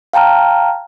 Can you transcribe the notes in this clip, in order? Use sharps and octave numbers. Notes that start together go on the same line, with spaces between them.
F5 G5 A5 A#5 F6